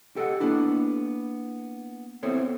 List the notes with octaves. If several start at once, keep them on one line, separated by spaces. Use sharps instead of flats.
G4 A4 D#5 F5 F#5
A#3 B3 D4 E4
B3 C4 E4 A4 C5 C#5